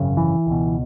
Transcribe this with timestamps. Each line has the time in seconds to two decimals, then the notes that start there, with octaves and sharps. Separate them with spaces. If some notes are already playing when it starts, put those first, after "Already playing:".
Already playing: G#1 F#2 C#3
0.17 E3
0.46 C#2 B2